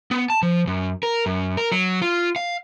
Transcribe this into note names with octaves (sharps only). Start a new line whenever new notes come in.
B3
A5
F3
F#2
A#4
F#2
A#4
F#3
F4
F5